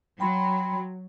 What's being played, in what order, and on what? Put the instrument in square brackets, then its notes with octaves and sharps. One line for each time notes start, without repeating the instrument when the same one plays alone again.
[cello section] F#3 [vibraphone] G5 B5 C6